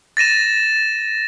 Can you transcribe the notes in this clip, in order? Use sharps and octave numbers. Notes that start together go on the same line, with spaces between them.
A6 A#6 D#7 E7